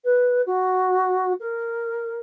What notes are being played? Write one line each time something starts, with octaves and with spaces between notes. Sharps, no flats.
B4
F#4
A#4